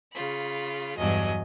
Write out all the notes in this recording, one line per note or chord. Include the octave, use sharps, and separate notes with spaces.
C#3 F4 B5
E2 G2 F#3 D#5 G#5